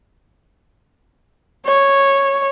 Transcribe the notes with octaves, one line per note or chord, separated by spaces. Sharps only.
C#5